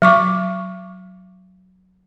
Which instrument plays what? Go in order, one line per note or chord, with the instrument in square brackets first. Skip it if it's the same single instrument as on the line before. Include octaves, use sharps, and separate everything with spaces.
[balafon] F#3 C#6 D6